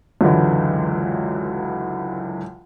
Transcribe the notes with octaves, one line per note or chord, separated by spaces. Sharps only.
C#2 F#2 D3 E3